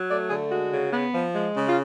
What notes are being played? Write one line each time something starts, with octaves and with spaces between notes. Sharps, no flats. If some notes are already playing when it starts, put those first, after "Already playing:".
Already playing: F#3
A3 D5
D3 G#4
G#3 F#4
C#3
B3
F3
G#3
C#3
F4